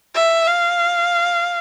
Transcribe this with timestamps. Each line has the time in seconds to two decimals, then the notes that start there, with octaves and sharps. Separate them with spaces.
0.15 E5
0.47 F5